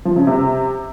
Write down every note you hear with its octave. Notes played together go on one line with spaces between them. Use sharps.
F3
C#3
C3